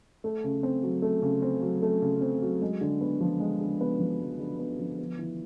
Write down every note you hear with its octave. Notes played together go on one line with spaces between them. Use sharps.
A3
C#3
C4
F#3
A3
C#3
C4
F#3
A3
C#3
C4
F#3
G#3
D3
B3
F3
G#3
D3
B3
F3
G#3
D3
B3
F3
B3
E3